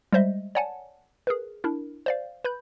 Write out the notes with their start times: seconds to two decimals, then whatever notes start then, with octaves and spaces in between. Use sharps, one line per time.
0.13 G3 G#3 C5 D#5 E5
0.55 C#5 D5 F#5 G#5 A5
1.27 G#4 A#4 B4
1.64 D4 E4 A#4
2.06 C5 D5 F5
2.44 B4 B5 G6